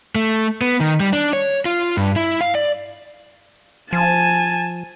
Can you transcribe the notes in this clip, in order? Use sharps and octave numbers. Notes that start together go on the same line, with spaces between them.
A3
B3
D#3
G3
D4
C#5
F4
G2
E4
F5
D5
F3 G#5 A5